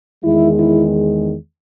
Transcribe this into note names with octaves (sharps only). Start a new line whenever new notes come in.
E2 D#3 G#3 E4
E4